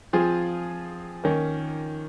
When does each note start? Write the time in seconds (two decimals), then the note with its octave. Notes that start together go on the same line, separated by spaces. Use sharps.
0.13 F3 C4 F4 G#4
1.24 D#3 A#3 C#4